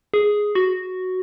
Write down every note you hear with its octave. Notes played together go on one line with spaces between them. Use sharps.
G#4
F#4